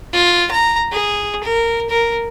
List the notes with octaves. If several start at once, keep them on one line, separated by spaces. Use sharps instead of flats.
F4
A#5
G#4
A#4
A#4